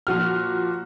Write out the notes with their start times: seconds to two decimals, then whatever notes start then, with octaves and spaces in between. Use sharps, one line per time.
0.07 A#2 F3 F#4 F6